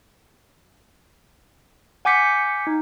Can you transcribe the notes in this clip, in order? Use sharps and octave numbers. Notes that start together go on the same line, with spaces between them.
F#5 G#5 D6 G6 B6 C#7
D#4